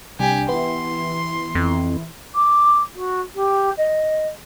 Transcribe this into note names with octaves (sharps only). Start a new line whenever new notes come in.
C2 D4 G4 G#5
E3 B3 E4 C6
F2
D6
F#4
G4
D#5